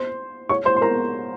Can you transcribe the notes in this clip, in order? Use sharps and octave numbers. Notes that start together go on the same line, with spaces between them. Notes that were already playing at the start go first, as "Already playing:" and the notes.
Already playing: C5 C6
C#5 C#6
C5 C6
C6
A#4 A#5